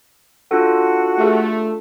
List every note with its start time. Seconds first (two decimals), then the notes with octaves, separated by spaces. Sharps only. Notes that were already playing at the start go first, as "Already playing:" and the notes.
0.51 D4 F4 F#4 A4
1.19 A3 G4 G#4 B4